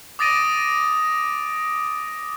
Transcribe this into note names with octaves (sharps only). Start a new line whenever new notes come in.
D6 D#6 A6 A#6 D7 D#7